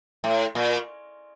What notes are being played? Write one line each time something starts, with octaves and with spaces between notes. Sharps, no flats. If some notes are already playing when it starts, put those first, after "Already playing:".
A2
A#2